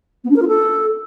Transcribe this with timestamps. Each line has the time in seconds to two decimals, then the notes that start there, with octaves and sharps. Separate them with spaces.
0.24 B3
0.30 D4
0.35 A#4
0.41 F4
0.47 A4